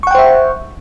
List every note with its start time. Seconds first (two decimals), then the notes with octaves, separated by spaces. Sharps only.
0.03 C#6
0.07 F#5
0.11 G5
0.15 C5
0.19 E5